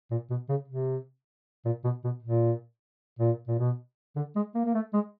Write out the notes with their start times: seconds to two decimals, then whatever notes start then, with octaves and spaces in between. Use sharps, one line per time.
0.11 A#2
0.30 B2
0.49 C#3
0.68 C3
1.65 A#2
1.84 B2
2.04 B2
2.23 A#2
3.19 A#2
3.48 A#2
3.58 B2
4.16 D3
4.35 G#3
4.55 A#3
4.65 A#3
4.74 A3
4.93 G#3